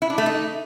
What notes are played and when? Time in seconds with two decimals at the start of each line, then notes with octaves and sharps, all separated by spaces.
0.02 E4
0.10 D4
0.18 A3
0.26 D#4